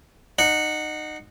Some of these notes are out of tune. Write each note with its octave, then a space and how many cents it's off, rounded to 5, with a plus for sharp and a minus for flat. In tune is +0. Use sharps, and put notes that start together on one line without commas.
D#4 -25 F#5 -5